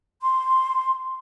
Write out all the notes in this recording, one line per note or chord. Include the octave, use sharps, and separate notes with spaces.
C6